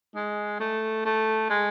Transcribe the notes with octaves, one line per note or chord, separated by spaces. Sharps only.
G#3
A3
A3
G#3